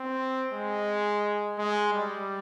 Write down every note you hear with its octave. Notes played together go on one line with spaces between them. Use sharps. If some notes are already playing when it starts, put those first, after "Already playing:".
Already playing: C4
G#3
G#3
G3